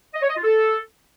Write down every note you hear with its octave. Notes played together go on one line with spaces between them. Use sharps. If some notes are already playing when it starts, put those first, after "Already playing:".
D#5
C#5
D#5
F4
A4